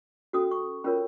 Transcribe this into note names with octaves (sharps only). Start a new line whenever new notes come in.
C#4 F#4 A4 D#6
C#6
C#4 F4 A#4 C#5 B5